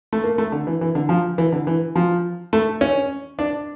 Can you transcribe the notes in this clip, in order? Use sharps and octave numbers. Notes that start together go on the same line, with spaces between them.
A3
A#3
A3
D3
E3
E3
D3
F3
E3
D3
E3
F3
A3
C#4
D4